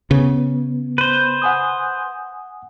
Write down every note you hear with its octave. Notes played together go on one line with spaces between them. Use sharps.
C#3 B3
B4 C5
F#5 G#5 D#6